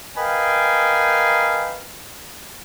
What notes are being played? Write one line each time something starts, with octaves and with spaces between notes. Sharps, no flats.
A#4 B4 D#5 F5 G5 G#5